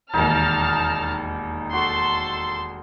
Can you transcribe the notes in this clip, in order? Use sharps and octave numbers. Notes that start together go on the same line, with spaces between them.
E1 D#2 D#4 A#4 A5 A#5 F6
F#4 A4 C6